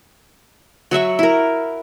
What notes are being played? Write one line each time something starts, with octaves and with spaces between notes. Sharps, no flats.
F#3 F#4 E5 C#6
E4 A#4